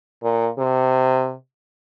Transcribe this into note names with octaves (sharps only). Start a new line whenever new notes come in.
A#2
C3